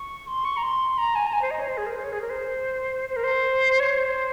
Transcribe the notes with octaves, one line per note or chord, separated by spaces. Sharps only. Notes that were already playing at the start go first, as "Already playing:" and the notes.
Already playing: C#6
C6
C#6
A#5
C6
A#5
G#5
A#5
G#5
C5
D#5
C#5
C5
G#4
A#4
C5
C#5
G#4
A#4
C5
C5
A#4
C5
C#5
C5